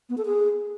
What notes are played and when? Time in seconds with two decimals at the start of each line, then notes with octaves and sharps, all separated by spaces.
0.09 B3
0.17 A4
0.25 G#4